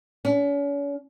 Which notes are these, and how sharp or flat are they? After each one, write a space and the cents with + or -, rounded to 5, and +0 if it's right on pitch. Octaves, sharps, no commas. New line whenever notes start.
C#4 +40